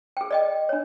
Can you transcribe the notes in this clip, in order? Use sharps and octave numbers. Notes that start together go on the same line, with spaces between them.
G#4 G5
D5 D#5 G5
D4 C#5